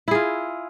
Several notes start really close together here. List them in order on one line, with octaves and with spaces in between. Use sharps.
E4 G#4 F4